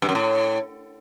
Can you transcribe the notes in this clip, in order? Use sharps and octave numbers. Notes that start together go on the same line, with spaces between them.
G2
F#2
A2